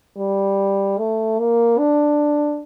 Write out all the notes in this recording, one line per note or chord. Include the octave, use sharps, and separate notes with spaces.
G3
A3
A#3
D4